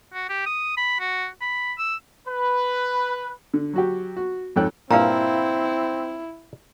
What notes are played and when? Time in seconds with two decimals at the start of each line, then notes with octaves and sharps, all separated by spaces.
0.14 F#4
0.29 G4
0.46 D#6
0.77 B5
1.00 F#4
1.41 B5
1.78 E6
2.27 B4
3.54 D3
3.74 F#3 F#4 G4
4.16 F#4
4.56 F2 G#2 A4 C#5 G5 F#6
4.91 G2 A#2 C4 E4 B4 F5 A#5